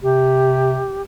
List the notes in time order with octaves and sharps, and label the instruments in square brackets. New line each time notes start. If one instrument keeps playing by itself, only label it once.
[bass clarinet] C3 [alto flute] G4